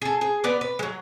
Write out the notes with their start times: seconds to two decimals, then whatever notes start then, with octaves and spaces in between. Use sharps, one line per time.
0.02 G#4 A4
0.21 G#4
0.44 B3 B4 D5 A#5
0.61 B4
0.79 F#3 G#3